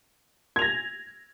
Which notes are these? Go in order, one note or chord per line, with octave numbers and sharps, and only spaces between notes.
G#6 A#6 F7